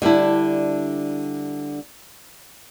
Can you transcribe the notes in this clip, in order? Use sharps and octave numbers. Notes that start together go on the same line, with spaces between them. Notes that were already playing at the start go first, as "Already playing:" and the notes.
D3 G3 D4 E4